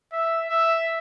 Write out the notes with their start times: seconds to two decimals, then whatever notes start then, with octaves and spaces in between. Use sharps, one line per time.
0.12 E5
0.49 E5